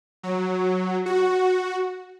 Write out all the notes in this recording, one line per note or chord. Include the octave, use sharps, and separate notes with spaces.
F#3
F#4